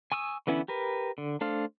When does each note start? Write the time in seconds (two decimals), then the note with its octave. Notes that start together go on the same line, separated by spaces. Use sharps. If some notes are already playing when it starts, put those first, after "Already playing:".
0.12 G#5 C#6 D#6 E6
0.47 D3 E3 B3 C#4 E4
0.68 G4 A#4 B4
1.18 D3
1.41 A3 D4 A4 C5 F5